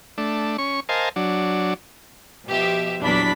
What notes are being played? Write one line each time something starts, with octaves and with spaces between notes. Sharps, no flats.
A3 D4
C#4 C#6
A#4 C5 D#5 F5 G#5 A5
F#3 D4
B2 F3 G4 E5
A#1 E2 F#3 D4 B5 B6